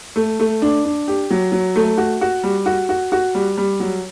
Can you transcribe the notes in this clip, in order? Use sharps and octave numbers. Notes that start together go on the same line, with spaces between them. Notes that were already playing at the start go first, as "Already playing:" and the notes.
A3
A3
D4
D4
G4
F#3
F#3
A3
F#4
F#4
G3
F#4
F#4
F#4
G3
G3
F#3